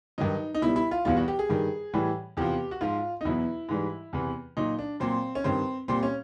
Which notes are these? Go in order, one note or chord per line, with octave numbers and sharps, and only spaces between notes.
G2 D#3 F#3 D#4
D#4
B2 G3 E4
E4
F4
E2 B2 G3 F4
F#4
G4
G#4
G2 D#3 G3
A2 E3 G3
E2 C3 F3 G4
F#4
G#2 F3 F4
D#4
E2 B2 F#3 E4
G#2 E3 G3
E2 C3 E3
A#2 F#3 D#4
D4
A#2 F#3 C4
C#4
G2 D#3 G3 C4
A#2 G3 C4
C#4